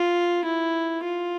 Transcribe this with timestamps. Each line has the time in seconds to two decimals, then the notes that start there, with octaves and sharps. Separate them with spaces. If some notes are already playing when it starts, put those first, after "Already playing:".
Already playing: F4
0.45 E4
1.05 F4